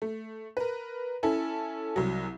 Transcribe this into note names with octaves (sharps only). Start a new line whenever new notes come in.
A3
A#4 B4
C#4 E4 A4
C2 F#3